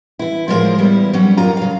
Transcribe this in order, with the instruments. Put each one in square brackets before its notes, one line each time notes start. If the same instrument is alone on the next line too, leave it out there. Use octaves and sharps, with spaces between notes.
[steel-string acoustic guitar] E3 E4
A2 F3 G#3 F4 A#4 C5
E2 G3 E4
F#3 G3 C#4
F#2 D#3 A#3 F4 A#5
C#3 F5